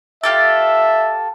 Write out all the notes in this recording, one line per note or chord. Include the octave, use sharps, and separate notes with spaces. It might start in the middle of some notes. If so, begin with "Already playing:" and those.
F4 G4 A4 E5